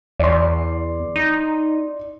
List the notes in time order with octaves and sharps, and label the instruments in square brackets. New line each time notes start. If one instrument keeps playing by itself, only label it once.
[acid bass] E2 [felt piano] D5 C6
[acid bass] D#4